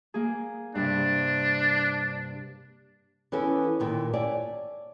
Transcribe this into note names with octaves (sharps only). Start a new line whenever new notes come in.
A#3 G#4
G2 C3 D4
E3 B3 C#4 E4 A4
D#2 A#2 D#3 E3
C#5 D5 E5 G#5 A5